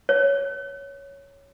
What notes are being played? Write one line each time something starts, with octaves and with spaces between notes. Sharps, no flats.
C#5